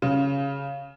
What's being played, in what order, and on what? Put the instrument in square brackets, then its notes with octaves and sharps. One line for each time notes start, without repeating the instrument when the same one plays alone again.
[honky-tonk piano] C#3